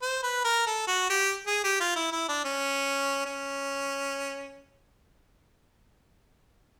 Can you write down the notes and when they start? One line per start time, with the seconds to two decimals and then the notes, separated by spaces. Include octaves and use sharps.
0.02 C5
0.23 B4
0.44 A#4
0.66 A4
0.87 F#4
1.10 G4
1.47 G#4
1.64 G4
1.80 F4
1.96 E4
2.12 E4
2.28 D4
2.44 C#4
3.25 C#4